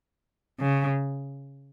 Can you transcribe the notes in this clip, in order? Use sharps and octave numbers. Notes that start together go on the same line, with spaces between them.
C#3